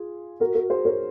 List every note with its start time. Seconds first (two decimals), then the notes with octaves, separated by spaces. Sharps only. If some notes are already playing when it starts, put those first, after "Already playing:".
Already playing: F4 G#4
0.40 F#4 A#4
0.55 F#4 A#4
0.70 G#4 C5
0.85 A#4 C#5